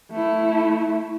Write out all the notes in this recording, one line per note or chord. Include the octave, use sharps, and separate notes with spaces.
A3 E4